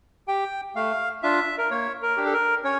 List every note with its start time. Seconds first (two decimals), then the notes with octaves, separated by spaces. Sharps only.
0.28 G4 G5
0.75 A3 F5
1.23 D4 F4 E5
1.58 A#4
1.70 A#3 C#5
2.02 A#4
2.17 D4 G4
2.26 A4
2.33 A#4
2.64 C#4 C#5